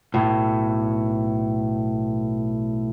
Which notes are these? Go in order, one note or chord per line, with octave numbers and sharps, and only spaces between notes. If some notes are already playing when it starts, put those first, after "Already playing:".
B1 A2